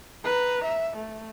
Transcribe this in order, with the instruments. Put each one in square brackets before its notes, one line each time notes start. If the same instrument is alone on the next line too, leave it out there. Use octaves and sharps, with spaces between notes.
[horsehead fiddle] B4 A#5
E5
A3